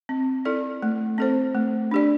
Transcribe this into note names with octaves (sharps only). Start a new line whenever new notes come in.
C4
E4 A4 D5
A3
C4 A4 C5
A3
D4 G4 D5